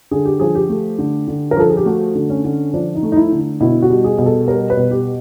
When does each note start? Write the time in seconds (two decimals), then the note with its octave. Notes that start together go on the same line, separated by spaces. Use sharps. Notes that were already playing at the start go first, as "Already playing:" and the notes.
0.11 D3 G#4
0.25 G4
0.40 F3 G#4
0.55 G4
0.69 A3
0.99 D3
1.28 D3
1.51 A#4
1.57 F3 A4
1.69 G#4
1.77 G4
1.86 A3 F#4
2.15 D3
2.30 C#4
2.45 D3
2.74 F3 D4
2.95 D#4
3.03 A3
3.12 D#4
3.16 E4
3.32 D3
3.60 B2 E4
3.82 F#4
3.90 G3
4.04 G#4
4.19 B2
4.26 A4
4.48 G3 A#4
4.70 B4
4.77 B2
4.91 G4